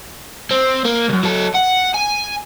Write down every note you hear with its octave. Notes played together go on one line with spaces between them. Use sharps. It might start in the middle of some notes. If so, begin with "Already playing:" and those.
C4
A#3
C2 F#2
F#3 A4
F#5
G#5